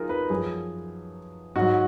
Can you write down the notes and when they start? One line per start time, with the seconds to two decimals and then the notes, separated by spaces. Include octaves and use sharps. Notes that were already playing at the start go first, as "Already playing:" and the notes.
Already playing: F#3 D#4 F4 G#4 A#4
0.09 B4
0.30 F#2 F3 G#4
1.56 G#2 F#3 F#4